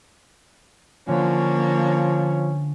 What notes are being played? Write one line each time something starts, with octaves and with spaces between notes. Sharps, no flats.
D3 F3 A#3 C#4 D4 C#5